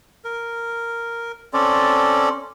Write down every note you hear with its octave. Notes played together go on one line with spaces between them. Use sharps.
A#4
C4 C#4 A4 D5